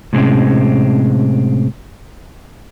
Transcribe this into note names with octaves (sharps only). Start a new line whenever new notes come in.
A2 C3 G#3 C4 C#4